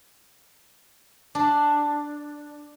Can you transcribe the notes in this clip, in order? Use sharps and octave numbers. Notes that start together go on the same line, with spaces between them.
D4